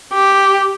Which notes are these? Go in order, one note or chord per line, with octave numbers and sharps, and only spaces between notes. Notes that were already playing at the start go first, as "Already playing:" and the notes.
G4